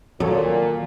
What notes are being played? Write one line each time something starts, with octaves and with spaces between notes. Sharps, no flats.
A#2 D#3 F#3 A4 C#5